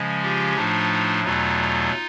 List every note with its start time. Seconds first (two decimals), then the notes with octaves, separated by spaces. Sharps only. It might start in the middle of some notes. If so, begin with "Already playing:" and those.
Already playing: C#3 F3 G#3 C#4
0.22 F4 G4
0.56 A2 F3 A3 D4 D#4 F4
1.24 E2 B2 F#3 A3 D#4 F4